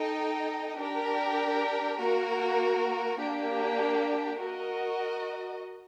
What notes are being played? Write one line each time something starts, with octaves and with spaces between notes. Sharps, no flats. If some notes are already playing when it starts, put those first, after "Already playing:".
Already playing: D#4 A4 D#5 G5
D4 G4 A#4
A#3 F#4 A#4
A#3 D4 G4
F#4 A#4 D#5